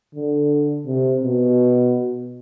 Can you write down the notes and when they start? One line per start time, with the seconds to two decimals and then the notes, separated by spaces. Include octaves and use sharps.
0.15 D3
0.87 C3
1.23 B2